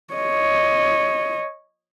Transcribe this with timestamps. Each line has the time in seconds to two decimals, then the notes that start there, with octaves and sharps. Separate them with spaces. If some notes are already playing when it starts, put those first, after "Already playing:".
0.14 C#5 D#5